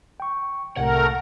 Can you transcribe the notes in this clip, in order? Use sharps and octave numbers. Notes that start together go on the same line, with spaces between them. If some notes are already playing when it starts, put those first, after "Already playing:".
G5 C#6
C2 A2 C3 A3 A#4 F#5